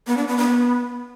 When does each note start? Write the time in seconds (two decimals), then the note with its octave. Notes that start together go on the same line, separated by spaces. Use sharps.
0.07 B3
0.17 D4
0.27 B3
0.38 B3